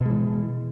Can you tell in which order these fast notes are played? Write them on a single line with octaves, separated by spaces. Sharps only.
B2 G#3 E3